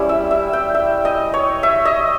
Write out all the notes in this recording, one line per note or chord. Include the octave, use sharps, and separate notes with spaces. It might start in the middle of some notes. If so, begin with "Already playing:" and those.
Already playing: G3 C#4 E4
E5
E5
G5
E5
D#5
C#5
E5
D#5